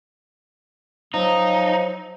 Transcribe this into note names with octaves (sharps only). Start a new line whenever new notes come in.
F3 F#3 D#4